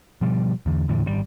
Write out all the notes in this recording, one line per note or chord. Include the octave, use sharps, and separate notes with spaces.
B2 F3 G3
E2 D3
E2 A2 D3 E3
G#1 B2 G3